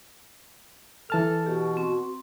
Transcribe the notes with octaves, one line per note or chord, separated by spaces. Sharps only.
E3 A4 A5 F6
B2 F#4 G4
C4